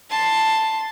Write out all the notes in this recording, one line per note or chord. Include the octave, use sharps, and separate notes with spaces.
A5 C6